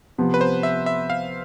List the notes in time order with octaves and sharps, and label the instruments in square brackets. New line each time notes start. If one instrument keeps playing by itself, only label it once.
[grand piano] C3 F3 B3
[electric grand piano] B4
C5
E5
E5
F5